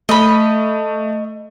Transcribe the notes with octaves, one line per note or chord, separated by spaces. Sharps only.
A3 D#5 B5